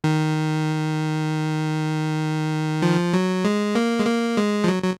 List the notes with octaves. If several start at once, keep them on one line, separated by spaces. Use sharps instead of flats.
D#3
F3
F#3
G#3
A#3
G#3
A#3
G#3
F3
F#3
F#3